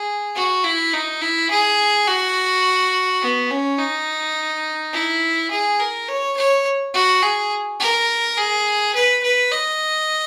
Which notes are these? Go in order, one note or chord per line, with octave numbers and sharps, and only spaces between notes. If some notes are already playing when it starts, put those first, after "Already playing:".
Already playing: G#4
F#4
E4
D#4
E4
G#4
F#4
B3
C#4
D#4
E4
G#4
A#4
C#5
C#5
F#4
G#4
A#4
G#4
B4
B4
D#5